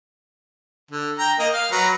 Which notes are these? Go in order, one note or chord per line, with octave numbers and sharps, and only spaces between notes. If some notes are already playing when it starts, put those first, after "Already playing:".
D3
G5 A#5
A#3 A#4 D#5
F5
F#3 B4 A#5